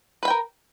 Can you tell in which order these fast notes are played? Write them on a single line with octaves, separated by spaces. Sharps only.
B4 B5 G5 A#4